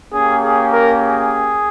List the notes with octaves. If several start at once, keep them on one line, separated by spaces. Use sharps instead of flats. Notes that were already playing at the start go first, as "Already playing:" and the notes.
A#3 C#4 G4 G#4
G#4
A#4
G#4